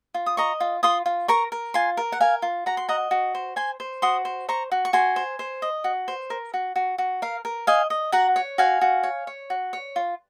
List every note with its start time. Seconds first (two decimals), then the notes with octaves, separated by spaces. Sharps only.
0.14 F4
0.26 D#6
0.37 D#5 A#5 C#6
0.60 F4
0.83 F4 C6 D#6
1.06 F4
1.28 A#4 A#5 C#6
1.52 A#4
1.74 F4 G#5 C6
1.97 A#4
2.12 F#5
2.20 A#4 F5 G#5
2.42 F4
2.66 F#4 A#5
2.77 C6
2.88 D#5 F#5 A#5
3.11 F#4
3.35 C5
3.56 C5 G#5 C6
3.80 C5
4.02 F#4 C6 D#6
4.25 C5
4.49 C5 A#5 C#6
4.72 F#4
4.85 C#6
4.93 F#4 G#5 C6
5.16 C5
5.39 C5
5.62 D#5
5.84 F#4
6.08 C5
6.30 A#4
6.54 F#4
6.76 F#4
6.98 F#4
7.22 A#4 F5
7.45 A#4
7.67 D#5 F5 G#5
7.90 D#5
8.12 F#4 F#5 A#5
8.36 C#5
8.58 F#4 F5 G#5
8.81 F#4
9.03 C#5
9.27 C#5
9.50 F#4
9.73 C#5
9.96 F4